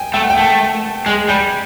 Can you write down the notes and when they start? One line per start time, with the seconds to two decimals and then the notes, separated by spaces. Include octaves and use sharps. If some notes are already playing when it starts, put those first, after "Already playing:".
Already playing: G5 G#5
0.14 A3 G5
0.23 F#5
0.30 G5
0.37 A3
1.06 G#3 G#5
1.29 G3 G#5